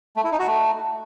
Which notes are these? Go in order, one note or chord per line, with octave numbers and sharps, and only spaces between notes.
A3
E4
D#4
F#4
A3